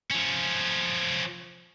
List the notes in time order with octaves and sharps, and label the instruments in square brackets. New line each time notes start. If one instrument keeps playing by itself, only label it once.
[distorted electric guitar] F3 C#4